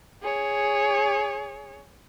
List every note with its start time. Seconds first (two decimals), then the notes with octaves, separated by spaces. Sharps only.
0.22 G#4 C#5